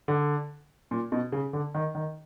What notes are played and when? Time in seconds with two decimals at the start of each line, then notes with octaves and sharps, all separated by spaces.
0.08 D3
0.91 A#2
1.12 B2
1.32 C#3
1.53 D3
1.75 D#3
1.95 D#3